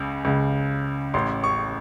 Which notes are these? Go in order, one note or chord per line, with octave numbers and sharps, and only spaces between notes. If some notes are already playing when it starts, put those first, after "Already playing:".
Already playing: C#2 C#3
C#2 C#3
A1 A2 C6
C#6